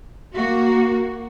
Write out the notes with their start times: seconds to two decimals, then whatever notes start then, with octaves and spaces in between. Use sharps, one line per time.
0.34 A#3 F#4